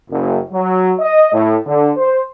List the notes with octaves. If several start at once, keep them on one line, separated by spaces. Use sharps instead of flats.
F#1
F#3
D#5
A2
D3
C5